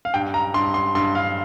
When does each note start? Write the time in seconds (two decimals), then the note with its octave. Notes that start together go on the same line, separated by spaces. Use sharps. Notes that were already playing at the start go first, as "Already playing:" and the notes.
0.05 F5
0.14 G2 G5
0.34 A#5
0.54 G2 C6
0.74 C6
0.95 G2 C6
1.15 F5